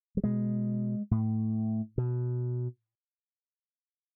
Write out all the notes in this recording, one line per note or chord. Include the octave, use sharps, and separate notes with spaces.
G3
B2 G#3
A2
B2